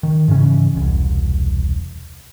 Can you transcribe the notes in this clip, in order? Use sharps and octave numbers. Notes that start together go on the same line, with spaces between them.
D#3
G#2 C#3 E3 C#4
E1 C2